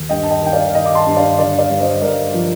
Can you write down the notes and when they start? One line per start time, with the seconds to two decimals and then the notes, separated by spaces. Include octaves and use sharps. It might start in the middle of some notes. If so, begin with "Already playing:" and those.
Already playing: D#2
0.09 G2 D#5 G5
0.23 A5
0.31 D#5 G5
0.42 D#3 G5
0.52 D5 F5
0.69 F5
0.74 D#3 D#5 G5
0.86 D6
0.95 A5 C6
1.07 G2
1.17 D5 F5
1.38 D3 D5 F5
1.59 D5 F5
1.70 G2
1.80 C5 D#5
2.01 G2 A#4 D5
2.34 F3